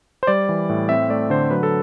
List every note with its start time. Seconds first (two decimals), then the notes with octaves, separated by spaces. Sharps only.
0.23 C5
0.27 G3 D5
0.49 E3
0.69 A2
0.89 C4 E5
1.10 A3 D5
1.30 D3 C5
1.51 F#3 B4
1.63 A4